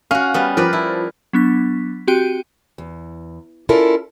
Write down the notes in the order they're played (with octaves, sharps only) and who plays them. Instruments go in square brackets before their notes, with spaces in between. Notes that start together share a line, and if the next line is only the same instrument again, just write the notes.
[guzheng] C#4 F#4 [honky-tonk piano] F5 F6
[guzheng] G3 B3
[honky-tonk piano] F3 [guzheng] A#4 B4 D5
[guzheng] E4
[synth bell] F#3 B3 D4 B6
C4 F#4 G4 G5 D#7
[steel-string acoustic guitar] E2
C#4 E4 F4 A4 A#4 D5